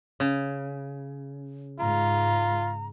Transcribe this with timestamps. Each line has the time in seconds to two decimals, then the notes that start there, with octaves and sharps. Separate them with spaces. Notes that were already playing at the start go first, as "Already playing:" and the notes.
0.20 C#3
1.80 G#2 F4 A#5